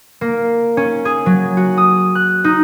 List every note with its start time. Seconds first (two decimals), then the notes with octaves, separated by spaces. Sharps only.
0.21 A#3
0.77 C#4
1.05 G#4
1.26 F#3
1.57 F#4
1.77 D#6
2.15 F#6
2.44 D#4